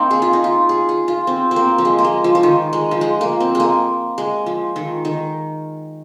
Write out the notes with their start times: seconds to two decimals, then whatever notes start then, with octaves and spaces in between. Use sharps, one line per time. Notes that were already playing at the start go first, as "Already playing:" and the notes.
Already playing: A#3 C4 D#4
0.11 G#4
0.22 F4
0.33 D#4
0.44 F4
0.69 G#4
0.89 G#4
1.08 F4
1.27 C4
1.51 C4
1.56 A#3
1.78 F3
1.85 G#3
1.99 A#3
2.04 G#3
2.24 F3
2.35 F3
2.43 D#3
2.73 G#3
2.91 F3
3.01 G#3
3.21 A#3
3.40 C4
3.55 G#3 A#3
4.18 G#3
4.46 F3
4.76 D#3
5.05 D#3